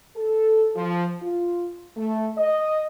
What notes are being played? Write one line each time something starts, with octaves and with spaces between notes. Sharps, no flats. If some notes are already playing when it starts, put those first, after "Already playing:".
A4
F3
F4
A3
D#5